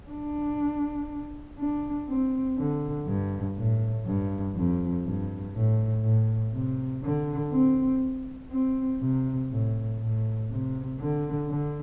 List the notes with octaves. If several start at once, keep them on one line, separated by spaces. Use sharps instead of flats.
D4
D4
C4
D3
G2
A2
G2
F2
G2
A2
A2
C3
D3
C4
C4
C3
A2
A2
C3
D3
D3